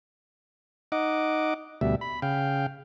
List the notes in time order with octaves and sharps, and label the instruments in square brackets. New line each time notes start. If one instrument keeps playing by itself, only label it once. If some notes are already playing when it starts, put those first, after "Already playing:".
[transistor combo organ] D#4 D#5 F#5 D6
D2 B2 G3 E5
B5
C#3 F5 G5